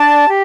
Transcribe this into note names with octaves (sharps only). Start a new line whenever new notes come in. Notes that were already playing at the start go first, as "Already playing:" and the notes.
Already playing: D4 D5 A5
G4